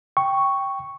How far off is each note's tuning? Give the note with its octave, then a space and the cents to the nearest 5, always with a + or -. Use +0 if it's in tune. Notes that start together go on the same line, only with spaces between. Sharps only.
G5 +0 C#6 +0